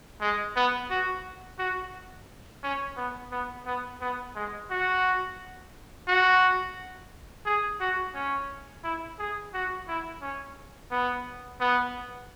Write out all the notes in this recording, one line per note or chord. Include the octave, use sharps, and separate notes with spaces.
G#3
B3
F#4
F#4
C#4
B3
B3
B3
B3
G#3
F#4
F#4
G#4
F#4
C#4
E4
G#4
F#4
E4
C#4
B3
B3